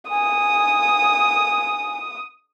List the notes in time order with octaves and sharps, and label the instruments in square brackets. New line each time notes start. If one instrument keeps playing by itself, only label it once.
[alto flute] G#5 [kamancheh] D#6